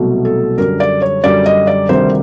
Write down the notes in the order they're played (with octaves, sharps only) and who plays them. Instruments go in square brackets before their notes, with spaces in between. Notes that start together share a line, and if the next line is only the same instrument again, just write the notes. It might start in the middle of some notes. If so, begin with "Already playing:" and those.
Already playing: [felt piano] C2 B2 F#3 A3
A4
F#2 D3 G3 A#4
D5
C#5
F#2 D3 G3 D5
D#5
D5
D2 C3 D#3 G3 C5